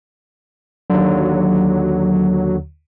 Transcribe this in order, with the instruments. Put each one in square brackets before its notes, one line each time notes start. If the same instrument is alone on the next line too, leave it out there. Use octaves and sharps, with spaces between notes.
[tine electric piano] D#2 D3 [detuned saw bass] F#3